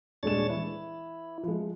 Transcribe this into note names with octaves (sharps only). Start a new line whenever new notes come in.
D#1 G#3 D4 C#5 A6 E7
E3 E4
F3 G#3